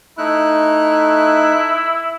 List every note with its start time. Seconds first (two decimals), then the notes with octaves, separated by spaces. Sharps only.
0.18 A3 D#4 E4 F#6